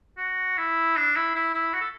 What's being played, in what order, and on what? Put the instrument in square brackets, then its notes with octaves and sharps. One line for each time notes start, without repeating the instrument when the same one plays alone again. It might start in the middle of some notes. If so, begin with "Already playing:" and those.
[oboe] F#4
E4
D4
E4
E4
E4
F#4
A4